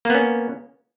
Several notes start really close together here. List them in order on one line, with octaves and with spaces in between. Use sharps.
A#3 B3 C#4